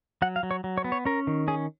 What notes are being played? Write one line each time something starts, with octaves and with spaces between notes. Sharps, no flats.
F#3 F#5
F5
F#3
C#5
F#3
C#5
B3
C#5
C#4 A#4
D#3
C#4 G#4